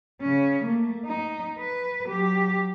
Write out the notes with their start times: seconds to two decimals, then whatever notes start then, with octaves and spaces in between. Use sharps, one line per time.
0.21 C#3 C#4
0.62 A3 A#3
1.05 D#4
1.59 B4
2.08 F#3 G4